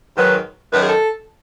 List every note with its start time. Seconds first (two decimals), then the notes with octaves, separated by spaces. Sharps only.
0.17 G#2 D#3 F#3 B4
0.72 F#2 D#3 F#3 B4
0.81 G#4
0.86 A4